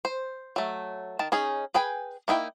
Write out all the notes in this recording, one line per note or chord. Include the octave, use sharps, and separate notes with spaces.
C5
F#3 A3
D#3 A5
C#4 D#4 G#4
G#4 B4 G5 G#5
A#3 D#4 E4 G5